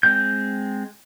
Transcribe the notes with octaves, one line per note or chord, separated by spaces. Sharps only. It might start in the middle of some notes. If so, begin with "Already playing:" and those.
G#3 C4 G6